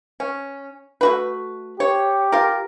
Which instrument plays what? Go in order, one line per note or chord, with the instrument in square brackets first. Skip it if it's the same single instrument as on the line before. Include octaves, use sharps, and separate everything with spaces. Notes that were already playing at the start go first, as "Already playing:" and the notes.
[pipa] C#4
A3 F#4 B4
[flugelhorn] G4 [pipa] C#5
[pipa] F4 A#4